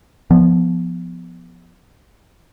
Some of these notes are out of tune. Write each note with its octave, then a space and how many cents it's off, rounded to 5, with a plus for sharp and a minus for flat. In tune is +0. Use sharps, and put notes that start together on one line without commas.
F3 +0 B3 +0